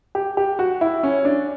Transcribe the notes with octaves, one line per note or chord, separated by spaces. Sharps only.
G4
G4
F#4
E4
C#4
D4